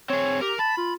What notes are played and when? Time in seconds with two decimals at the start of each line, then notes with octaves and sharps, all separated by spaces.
0.10 C4 G#4 C#5
0.42 G4 A#4
0.59 A5 B5
0.77 F4